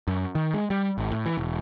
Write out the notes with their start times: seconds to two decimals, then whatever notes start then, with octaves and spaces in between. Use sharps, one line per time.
0.08 F#2
0.35 D#3
0.54 G#3
0.70 G3
0.98 G#1
1.12 A2
1.26 E3
1.37 E1